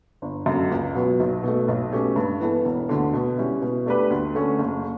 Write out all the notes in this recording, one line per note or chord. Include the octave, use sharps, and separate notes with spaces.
G1
F#2 D3
C#2
B2 F#3 B3
B1
B2 A3
B1
B2 A3 C#4 G4
G2
E3 B3 E4 A4
E1
D2 D3
B2
G3 C#4 E4
B2
A3 D4 G4 B4
D2
D3 A3 C#4
F#1